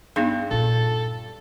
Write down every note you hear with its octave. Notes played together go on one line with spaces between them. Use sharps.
G2 B3 D#4 G#4
A#2 F4 A4